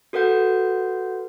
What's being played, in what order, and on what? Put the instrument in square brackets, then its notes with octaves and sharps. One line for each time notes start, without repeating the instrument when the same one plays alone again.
[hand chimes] F#4 A4 B4 F#5 G6